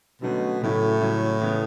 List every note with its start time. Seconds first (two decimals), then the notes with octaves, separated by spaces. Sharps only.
0.22 B2 D3 F#3 A3 C#4
0.61 A2 C#3 F#3 C#4 E4
1.01 C#3 F#3 C#4 E4
1.41 C#3 E3 B3